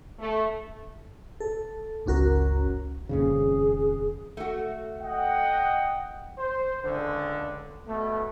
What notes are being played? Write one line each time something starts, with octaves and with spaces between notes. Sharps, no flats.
A3
A4
G1 C#2 C#4 F#4 A#4
D#1 F2 C#3 G#4
A3 F#4
D#5 F#5 G5
C5
C#2 D3
B2 A3